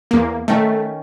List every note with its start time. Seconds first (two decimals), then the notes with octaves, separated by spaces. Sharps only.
0.11 E2 A#3
0.48 D#3 A3 C#4